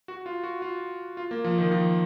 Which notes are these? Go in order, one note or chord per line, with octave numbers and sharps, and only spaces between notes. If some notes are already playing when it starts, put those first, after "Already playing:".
F#4
F4
F#4
F4
F4
A#3
F3
D#3
F3